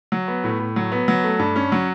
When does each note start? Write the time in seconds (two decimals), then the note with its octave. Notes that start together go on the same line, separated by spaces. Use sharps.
0.12 F#3
0.28 B3
0.44 A2
0.59 A2
0.76 F#3
0.92 B3
1.08 F#3
1.24 A3
1.39 G2
1.56 C#4
1.72 F#3